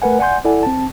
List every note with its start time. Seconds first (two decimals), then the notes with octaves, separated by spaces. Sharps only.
0.02 A3 A#4 B4 F#5 G#5
0.19 D5 F#5 G#5 C6 G6
0.45 E4 A4 D5 F#5 G#5
0.63 C4 A5